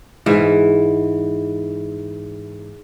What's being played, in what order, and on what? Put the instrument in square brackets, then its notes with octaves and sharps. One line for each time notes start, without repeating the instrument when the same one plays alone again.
[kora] G#2 E3